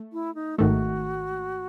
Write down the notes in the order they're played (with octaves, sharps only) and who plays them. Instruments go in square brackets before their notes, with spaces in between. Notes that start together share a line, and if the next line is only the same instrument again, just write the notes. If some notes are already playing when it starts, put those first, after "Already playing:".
Already playing: [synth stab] A3
[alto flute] E4
D#4
[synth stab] G#1 G#2 D#3 A3 [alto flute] F#4